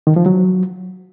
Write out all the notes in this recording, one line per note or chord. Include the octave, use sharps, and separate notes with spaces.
D#3
F3
F#3